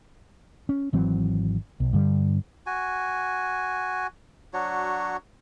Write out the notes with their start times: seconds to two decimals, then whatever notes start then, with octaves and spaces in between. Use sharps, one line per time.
0.69 C#4
0.93 G#1 E3 F#3 C4
1.80 B1
1.93 G2 D3 G3
2.66 F#4 G#5
4.54 F#3 D4 F#4 C#5